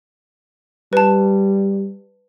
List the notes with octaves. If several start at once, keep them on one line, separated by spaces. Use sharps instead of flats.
G3 B4 A5